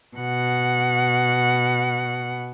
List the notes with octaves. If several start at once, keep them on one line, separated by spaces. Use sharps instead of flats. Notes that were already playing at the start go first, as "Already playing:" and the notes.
B2 F#5